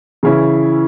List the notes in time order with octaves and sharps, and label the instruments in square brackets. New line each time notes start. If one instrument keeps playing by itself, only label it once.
[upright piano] C#3 E3 C#4 E4